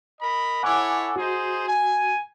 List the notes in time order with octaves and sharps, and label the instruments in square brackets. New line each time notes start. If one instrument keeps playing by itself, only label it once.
[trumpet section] A#4 D#5 B5
[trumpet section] E4 A4 C#5 [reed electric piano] F#5 G#5 D6
[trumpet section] D#4 G#4 C5 [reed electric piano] F#4
[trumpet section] G#5